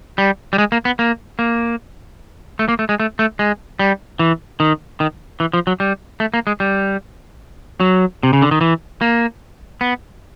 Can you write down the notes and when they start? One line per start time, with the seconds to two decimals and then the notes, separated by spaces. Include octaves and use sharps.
0.18 G3
0.53 G3
0.58 G#3
0.72 A#3
0.85 B3
0.99 A#3
1.39 A#3
2.59 A3
2.69 A#3
2.79 A3
2.89 G#3
3.00 A3
3.19 A3
3.39 G#3
3.79 G3
4.19 E3
4.60 D#3
5.00 D#3
5.40 E3
5.53 F3
5.67 F#3
5.80 G3
6.20 A3
6.34 A#3
6.47 G#3
6.60 G3
7.80 F#3
8.23 C3
8.33 C#3
8.42 D3
8.51 D#3
8.61 E3
9.01 A#3
9.81 B3